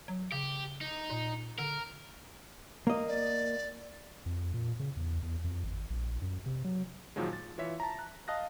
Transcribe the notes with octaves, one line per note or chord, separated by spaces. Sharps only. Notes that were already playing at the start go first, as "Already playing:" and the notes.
F#3
C#3 G4
D#4
A#2
D3 A#4
A#3 D#5
D5
F2
A#2
C#3
E2
E2
F2
G#1
A#1
F#2
C3
F#3
A#2 D#3 F3 F#3 G#3
A6
E3 F4 C#5 E5 B6
A5 A#5
F#6
D#5 F5 A5 D#6 F#6 A#6